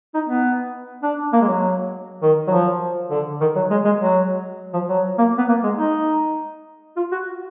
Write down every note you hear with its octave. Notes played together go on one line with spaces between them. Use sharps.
D#4
B3
D4
A#3
G#3
F#3
D#3
F#3
F3
D3
D#3
F#3
G#3
G#3
F#3
F3
F#3
A#3
B3
A#3
G#3
D#4
F4
F#4